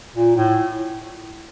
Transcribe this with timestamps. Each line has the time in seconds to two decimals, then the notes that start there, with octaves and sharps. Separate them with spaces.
0.16 A#2
0.36 A2